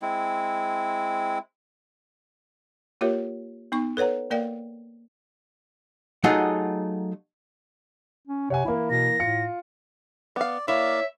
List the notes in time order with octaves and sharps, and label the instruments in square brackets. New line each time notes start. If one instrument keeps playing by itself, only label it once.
[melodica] G#3 C4 E4
[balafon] A#3 F4 G4 A#4 C#5 E5
B3 D#4 C#6
A4 B4 C#5 F#5 A#5
A#3 A#4 D5 F5 G5
[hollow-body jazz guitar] F#3 A3 D#4 F4 G#4 F#5
[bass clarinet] C#4
[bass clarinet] C3 [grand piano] C#5 F#5 G#5
[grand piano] E3 A#3 [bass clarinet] E4
[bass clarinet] B2 [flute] A#6
[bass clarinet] A2 [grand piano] F4 C#7
[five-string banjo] B3 F5 [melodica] D5
[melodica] A#3 D5 F5 [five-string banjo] E4 [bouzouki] C#5 [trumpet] E5